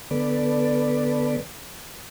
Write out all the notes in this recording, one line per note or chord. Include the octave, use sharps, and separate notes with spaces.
D3 B3 A4 B4 D5